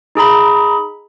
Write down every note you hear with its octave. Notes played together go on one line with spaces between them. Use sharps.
D#4 G#4 A#5 B5